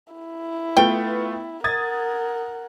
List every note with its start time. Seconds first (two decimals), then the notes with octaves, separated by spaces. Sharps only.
0.14 E4
0.77 A3 B3 F4 G5
1.64 A#4 F#5 D#6 G#6 A6